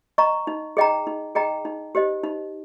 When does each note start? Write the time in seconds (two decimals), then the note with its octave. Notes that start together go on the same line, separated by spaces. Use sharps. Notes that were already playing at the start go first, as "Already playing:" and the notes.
0.18 D#5 A#5 C#6
0.47 D#4
0.77 G#4 D#5 G5 A#5
1.07 D#4
1.35 G#4 D#5 G5 A#5
1.65 D#4
1.95 G4 C5 D#5
2.24 D#4